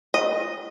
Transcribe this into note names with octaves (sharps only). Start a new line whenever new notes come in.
D#5